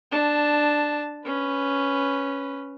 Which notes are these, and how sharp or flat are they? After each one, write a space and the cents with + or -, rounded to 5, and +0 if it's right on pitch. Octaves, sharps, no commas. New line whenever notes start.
D4 +10 A5 +0
C#4 +0 B4 +0